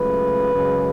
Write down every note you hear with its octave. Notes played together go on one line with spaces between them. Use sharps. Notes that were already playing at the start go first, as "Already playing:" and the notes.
Already playing: C#2 C#3 F#3 A3 B4
F#2 C#3 G#3